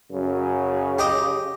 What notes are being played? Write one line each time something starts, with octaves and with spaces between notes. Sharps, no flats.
F#2 C#3
G4 D#5